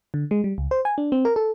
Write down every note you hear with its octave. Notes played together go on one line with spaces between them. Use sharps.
D3
G#3
G3
C#2
C5
G#5
D4
C4
A#4
A4